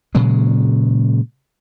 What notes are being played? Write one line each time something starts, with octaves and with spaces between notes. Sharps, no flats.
A#2 C#3 F#3 G#3